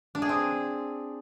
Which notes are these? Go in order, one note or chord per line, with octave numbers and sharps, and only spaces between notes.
D4
G#4
C4